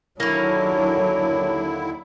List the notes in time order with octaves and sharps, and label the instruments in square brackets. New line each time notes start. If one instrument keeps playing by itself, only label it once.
[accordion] D#2 D3 E4 [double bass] F#3 D4 [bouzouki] A#3 C#4